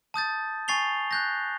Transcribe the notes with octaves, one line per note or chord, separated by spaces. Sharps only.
A5 D#6 G6 A6
G#5 C#6 A6 C7 F7 G7
F#6 G6 A#6